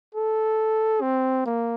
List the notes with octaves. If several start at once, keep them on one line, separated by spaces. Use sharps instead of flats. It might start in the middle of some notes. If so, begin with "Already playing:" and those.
A4
C4
A#3